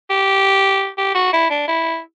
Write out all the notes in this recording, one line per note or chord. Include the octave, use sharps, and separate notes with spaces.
G4
G4
F#4
E4
D4
E4